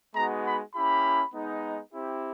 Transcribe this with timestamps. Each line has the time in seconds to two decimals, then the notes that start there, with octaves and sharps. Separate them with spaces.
0.16 G#3 B3 D#4 F#4 A#5
0.46 B5
0.75 A#3 C#4 E4 G4 B5
1.34 G#3 B3 D#4
1.94 C4 E4 G4